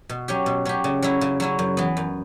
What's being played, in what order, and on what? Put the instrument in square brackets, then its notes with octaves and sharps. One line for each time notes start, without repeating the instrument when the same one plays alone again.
[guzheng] B2
F#3 C#4 G4
B2
F#3 C#4 G4
C#3
F#3 C#4 E4
C#3
F#3 C#4 E4
F#2
E3 B3
F#2